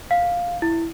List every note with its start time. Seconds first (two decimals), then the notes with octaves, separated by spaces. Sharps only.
0.11 F5
0.62 E4